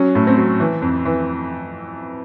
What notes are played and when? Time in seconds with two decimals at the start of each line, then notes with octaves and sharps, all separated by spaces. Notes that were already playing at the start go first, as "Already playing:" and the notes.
Already playing: F#3 C#4
0.15 A2
0.27 C4
0.38 F#3
0.60 E3
0.82 F2
1.05 E3